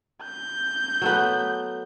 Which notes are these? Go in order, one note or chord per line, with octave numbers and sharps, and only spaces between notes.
G6
F#3 A3 B3